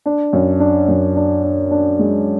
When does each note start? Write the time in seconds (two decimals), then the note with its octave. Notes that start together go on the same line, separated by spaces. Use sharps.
0.06 D4
0.33 F#2
0.60 D4
0.88 F#2
1.16 D4
1.43 D4
1.71 D4
1.99 G#3